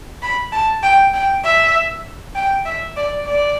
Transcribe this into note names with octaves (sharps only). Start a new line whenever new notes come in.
B5
A5
G5
G5
E5
G5
E5
D5
D5